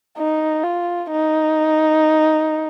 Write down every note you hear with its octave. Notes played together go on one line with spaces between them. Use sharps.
D#4
F4
D#4